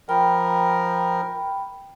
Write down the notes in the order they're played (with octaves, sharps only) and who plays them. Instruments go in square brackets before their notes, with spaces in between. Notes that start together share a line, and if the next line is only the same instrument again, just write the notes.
[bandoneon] F3 A#4 [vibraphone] G5 B5